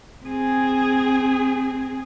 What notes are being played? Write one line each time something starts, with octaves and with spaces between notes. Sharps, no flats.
C4 G#4